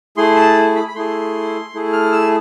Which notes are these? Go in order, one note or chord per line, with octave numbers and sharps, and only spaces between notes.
A3 E4 G#4 C6
A5
B5
B5
A3 E4 G#4 C6
A3 E4 G#4
F6
E6